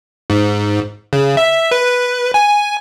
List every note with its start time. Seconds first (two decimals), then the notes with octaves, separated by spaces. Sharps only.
0.30 G#2
1.13 C#3
1.37 E5
1.71 B4
2.34 G#5